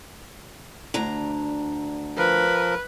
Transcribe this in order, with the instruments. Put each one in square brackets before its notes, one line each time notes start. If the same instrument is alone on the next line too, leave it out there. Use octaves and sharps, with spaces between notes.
[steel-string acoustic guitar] D2 D4 A#5
[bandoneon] F3 A#4 [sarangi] B4